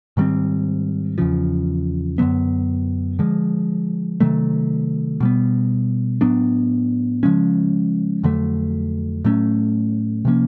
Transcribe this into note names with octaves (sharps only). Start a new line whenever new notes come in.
G#2 D#3 G3 C4
E2 C#3 F3
F#2 D3 F#3 B3
D3 F3 G#3
C3 D#3 F#3 A3
B2 G3 B3
A2 F#3 B3 D4
C#3 F3 G#3 C#4
F2 D3 F#3 A3
A2 F#3 A3 C#4
C3 F3 A#3 C#4